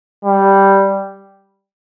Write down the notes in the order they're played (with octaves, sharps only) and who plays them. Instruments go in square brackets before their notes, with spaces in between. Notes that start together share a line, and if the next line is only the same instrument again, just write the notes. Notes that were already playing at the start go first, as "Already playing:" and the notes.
[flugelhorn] G3